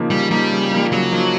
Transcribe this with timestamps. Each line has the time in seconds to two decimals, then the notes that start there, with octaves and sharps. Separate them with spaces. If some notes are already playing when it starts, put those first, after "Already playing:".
Already playing: C#3 F3 A#3 D#4
0.10 C#3 G3
0.31 F3 G3 A#3 D#4
0.52 C#3
0.72 F3 A#3 D#4
0.92 C#3 F#3
1.12 F3 A#3 D#4